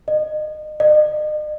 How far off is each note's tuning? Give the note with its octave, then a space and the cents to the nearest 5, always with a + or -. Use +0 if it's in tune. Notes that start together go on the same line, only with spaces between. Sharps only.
D#5 -30
D#5 -40